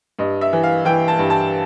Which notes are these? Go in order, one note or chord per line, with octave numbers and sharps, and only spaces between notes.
G2 D#5
E5
E3
F5
E3 G5
A5
G2
A5